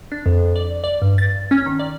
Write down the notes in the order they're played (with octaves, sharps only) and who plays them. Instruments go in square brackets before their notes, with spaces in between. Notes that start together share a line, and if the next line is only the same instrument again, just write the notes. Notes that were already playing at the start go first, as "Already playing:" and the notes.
[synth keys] D4
F2
D5
D5
G2
A6
C#4
D#3
D5